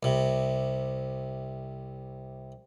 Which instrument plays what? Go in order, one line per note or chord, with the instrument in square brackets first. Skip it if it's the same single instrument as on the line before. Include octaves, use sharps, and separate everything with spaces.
[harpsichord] C2 C3